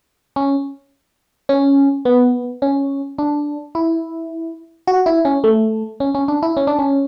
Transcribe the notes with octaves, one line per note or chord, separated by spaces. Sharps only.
C#4
C#4
B3
C#4
D4
E4
F#4
E4
C#4
A3
C#4
C#4
D4
E4
C#4
D4
C#4